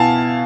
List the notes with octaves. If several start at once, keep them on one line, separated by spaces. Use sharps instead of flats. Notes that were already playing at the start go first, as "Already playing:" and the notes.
Already playing: B2 B3 E4 F5 G#5 A5